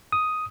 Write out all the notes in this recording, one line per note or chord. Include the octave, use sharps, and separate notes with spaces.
D#6